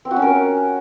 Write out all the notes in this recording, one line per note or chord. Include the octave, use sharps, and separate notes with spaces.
C4
F#4
C#4
A#4